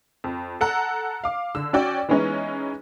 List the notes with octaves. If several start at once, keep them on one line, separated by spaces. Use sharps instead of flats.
F2
A4 F#5 A#5
F5 D6
D3 E6
C#4 F#4 D5 G5
E3 G#3 B3 C#4 D#4